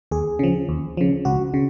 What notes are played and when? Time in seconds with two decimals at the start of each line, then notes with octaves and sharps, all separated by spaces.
0.11 D#2 G#4
0.39 C#3 F3
0.69 D#2
0.97 C#3 F3
1.25 C#2 F#4
1.54 C#3